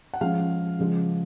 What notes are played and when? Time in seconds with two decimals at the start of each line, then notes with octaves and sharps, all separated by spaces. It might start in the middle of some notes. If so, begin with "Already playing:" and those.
0.14 F#5
0.21 F3 G#3 C#4 F5
0.79 C#3 F3 G#3